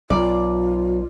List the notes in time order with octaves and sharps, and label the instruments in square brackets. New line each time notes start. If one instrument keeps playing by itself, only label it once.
[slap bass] B1 [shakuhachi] F4 [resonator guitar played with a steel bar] D5